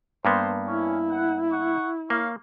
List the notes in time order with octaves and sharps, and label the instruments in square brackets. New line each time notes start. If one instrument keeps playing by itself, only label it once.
[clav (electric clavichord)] G2 A#3 B3 [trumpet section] C5
[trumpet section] C#4 [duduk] E4
[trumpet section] F#5
F#5 C#6
[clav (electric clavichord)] A#3 [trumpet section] C#5 F5